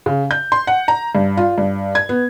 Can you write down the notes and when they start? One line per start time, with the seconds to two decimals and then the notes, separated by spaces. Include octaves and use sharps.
0.06 C#3
0.31 G6
0.52 C6
0.67 F#5
0.88 A#5
1.15 G2
1.37 F4
1.58 G2
1.95 G#6
2.09 B3